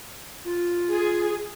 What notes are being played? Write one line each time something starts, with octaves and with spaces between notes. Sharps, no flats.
F4
G#4